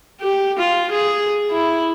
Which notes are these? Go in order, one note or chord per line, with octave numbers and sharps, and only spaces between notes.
G4
F4
G#4
E4